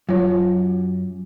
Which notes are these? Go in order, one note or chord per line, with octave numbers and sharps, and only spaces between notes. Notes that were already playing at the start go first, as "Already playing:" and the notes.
F#2 F#3 F4 C#5